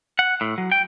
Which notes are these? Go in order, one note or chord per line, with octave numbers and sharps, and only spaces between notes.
F#5
A2
F#3
G5